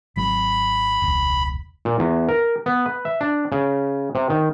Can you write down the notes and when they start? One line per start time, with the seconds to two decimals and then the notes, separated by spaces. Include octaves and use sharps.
0.16 G#1 F#3 C4 B5
1.02 E1 C#2
1.85 A#2
1.99 E2
2.28 A#4
2.66 B3
2.86 B4
3.05 E5
3.21 D4
3.52 C#3
4.15 C3
4.30 D#3